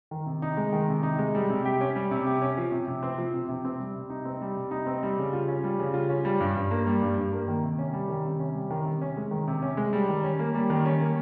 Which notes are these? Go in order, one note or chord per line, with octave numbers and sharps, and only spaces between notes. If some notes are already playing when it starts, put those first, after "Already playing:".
D#3
C3
D#4
G#3
D#3
C3
D#4
G#3
G3
C3
G4
C#4
G3
C3
G4
C#4
F3
C3
C3
C4
F3
C3
C3
C4
G3
C3
D#4
C4
G3
C3
D#4
C4
G3
C#3
F4
C#4
G3
C#3
F4
C#4
G3
G2
G2
A#3
G3
G2
G2
A#3
D#3
C3
C#4
G3
D#3
C3
C#4
G3
D#3
C3
C#4
G#3
D#3
C3
C#4
G#3
G3
D#3
C#4
A#3
G3
D#3
C#4
A#3